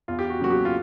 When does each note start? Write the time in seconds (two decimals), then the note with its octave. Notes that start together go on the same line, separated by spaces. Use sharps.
0.08 E2 F4
0.19 G4
0.30 F#4
0.40 C#3 F#3 A#3 F#4
0.50 G4
0.65 F4